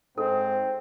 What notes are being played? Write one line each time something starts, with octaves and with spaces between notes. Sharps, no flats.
G#2 C4 A4